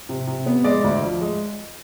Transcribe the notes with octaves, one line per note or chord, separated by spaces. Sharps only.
C3
C3
B3
G#3 D5
D2
F3
G#3